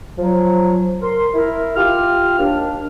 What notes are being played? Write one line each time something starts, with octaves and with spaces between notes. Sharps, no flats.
F3 F#3
A#4 C6
E4 A#4
F4 G4 F6
D#2 D4